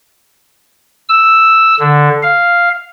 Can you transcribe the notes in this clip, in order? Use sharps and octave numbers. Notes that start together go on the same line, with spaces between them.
E6
D3
F5